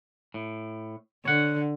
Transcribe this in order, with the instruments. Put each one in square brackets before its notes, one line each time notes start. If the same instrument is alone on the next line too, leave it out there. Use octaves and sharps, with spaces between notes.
[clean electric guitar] A2
[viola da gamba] D3 [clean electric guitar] C#5 F#5